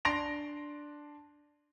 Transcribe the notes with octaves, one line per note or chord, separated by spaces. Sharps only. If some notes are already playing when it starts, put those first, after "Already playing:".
D4 C6 A#6 D7 F7